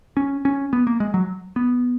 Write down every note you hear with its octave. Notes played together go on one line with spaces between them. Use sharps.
C#4
C#4
B3
A#3
G#3
F#3
B3